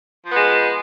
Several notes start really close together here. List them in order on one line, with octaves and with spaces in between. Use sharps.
F3 B3 G#3